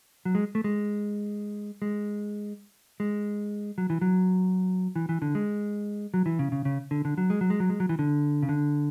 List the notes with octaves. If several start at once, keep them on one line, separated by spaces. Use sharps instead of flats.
F#3
G#3
A3
G#3
G#3
G#3
F#3
E3
F#3
E3
E3
D3
G#3
F#3
E3
C#3
C#3
C#3
D3
D3
F#3
G#3
F#3
G#3
F#3
G#3
F#3
E3
D3
C#3
D3